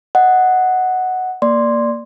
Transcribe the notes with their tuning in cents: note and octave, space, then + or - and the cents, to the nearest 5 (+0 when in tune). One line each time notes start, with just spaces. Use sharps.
D#5 +0 F#5 +0
A#3 -5 D5 +0 C6 +0